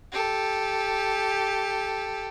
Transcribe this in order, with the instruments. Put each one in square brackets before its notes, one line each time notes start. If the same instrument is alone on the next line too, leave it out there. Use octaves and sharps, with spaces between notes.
[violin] G4 A4